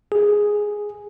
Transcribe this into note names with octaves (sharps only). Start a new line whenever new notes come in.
G#4